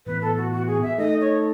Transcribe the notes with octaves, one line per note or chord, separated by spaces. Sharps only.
A2 E3 B3 B4
A4
F#4
F#4
G#4
E5
A3 D#4 A4 D#5
C#5